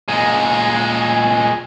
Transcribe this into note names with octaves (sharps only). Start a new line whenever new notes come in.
A#2 G#3